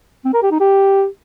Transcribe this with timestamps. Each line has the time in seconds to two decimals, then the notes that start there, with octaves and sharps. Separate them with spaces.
0.25 C4
0.34 A#4
0.43 G4
0.51 D#4
0.60 G4